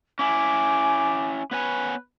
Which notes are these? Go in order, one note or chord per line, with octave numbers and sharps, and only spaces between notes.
C#4 E4 G#5 D6
B3 B4 C#5 G#5